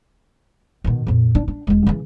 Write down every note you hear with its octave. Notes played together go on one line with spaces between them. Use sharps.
B2 D#3
F2 A#2
D4
D4
E1 G#3
C#3 E3